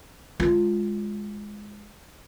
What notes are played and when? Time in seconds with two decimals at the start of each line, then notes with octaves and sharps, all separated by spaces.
0.40 G#3 F4